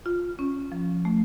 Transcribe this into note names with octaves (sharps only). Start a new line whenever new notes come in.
F4
C#4
F3
A3